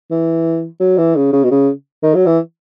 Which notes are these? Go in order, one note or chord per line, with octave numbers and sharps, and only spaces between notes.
E3
F#3
E3
C#3
C#3
B2
C#3
D#3
F#3
E3